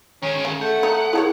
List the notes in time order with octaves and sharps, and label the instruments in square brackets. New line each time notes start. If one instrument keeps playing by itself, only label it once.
[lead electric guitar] D#3 G#4 [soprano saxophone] C#4
[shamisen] C#3
[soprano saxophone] A3 [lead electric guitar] F#5 [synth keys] G6
[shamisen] D#4
[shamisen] D#3 D4 C#5 [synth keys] E4 G#4